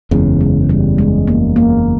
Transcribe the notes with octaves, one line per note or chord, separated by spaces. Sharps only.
F#1 E2 C#3 G#3
G#3
G3
G#3
A#3
A#3